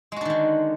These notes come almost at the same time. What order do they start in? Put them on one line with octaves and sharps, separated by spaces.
G#3 F#4 D4 D#3 D3